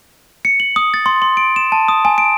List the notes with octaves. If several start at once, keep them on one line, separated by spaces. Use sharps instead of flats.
C#7
F#7
D#6
A6
C6
C6
D7
E7
A5
D#6
G#5
D7